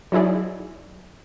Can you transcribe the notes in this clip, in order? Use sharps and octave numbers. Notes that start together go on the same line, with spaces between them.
F#3 D#4 E4 G#4 D5